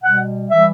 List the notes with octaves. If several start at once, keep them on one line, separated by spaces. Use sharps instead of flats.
B2 G3 F#5
E3 G3 E5